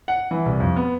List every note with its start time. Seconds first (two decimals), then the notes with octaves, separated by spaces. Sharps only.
0.08 F#5
0.31 E3
0.46 C2
0.60 F2
0.76 B3